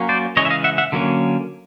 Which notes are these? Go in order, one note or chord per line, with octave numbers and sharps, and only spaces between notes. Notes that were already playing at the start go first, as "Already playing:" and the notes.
Already playing: F#3 A#3 C#4
C5 D5
C#3 E3 G#3 C#4 C#5 D#5
E5
D#5 F5
E5 F#5
E5 F#5
D3 F#3 A#3 C#4